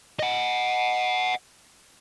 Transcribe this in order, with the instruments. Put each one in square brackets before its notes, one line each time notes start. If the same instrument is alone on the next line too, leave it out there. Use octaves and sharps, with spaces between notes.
[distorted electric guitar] D#5 F#5